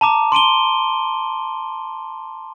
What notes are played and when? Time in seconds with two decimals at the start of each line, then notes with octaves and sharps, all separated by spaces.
0.01 A5 A#5 D6
0.32 C6 D7 D#7 G7